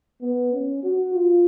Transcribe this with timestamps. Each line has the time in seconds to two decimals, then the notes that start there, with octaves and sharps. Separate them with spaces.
0.22 B3
0.53 C#4
0.83 F#4
1.15 F4